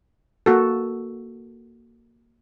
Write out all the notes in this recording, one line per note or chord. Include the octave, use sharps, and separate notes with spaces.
A#3 F#4 A4